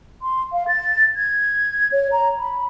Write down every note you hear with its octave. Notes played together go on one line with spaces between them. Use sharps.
C6
F5
A6
G#6
C#5
A#5
B5